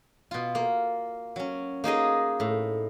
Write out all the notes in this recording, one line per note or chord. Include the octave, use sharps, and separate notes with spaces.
B2 F4
A#3
F#3 C#4
A#3 D#4 G#4 D#5
A2